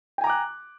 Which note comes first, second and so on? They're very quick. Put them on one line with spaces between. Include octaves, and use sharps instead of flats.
G5 G#5 A#5 D6 F#6